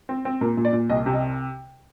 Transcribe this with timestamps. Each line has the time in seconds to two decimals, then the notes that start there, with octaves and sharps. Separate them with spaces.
0.09 C4
0.25 C4
0.41 A#2 A#4
0.57 A#2
0.65 D5
0.73 A#2
0.89 C2 D#5
1.06 C3
1.13 D#5